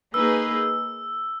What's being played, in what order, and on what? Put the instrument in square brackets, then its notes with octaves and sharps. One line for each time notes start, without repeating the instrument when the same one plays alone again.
[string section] A#3 D#4 G#4 B4 [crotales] E6